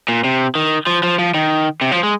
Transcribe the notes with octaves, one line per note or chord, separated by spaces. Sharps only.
A#2
C3
D#3
F3
F3
F3
D#3
C3
F3
G#3